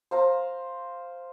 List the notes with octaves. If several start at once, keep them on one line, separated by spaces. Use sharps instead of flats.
C5 F5 A#5